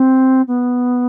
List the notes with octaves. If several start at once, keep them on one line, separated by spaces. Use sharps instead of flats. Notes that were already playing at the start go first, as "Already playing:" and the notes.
Already playing: C4
B3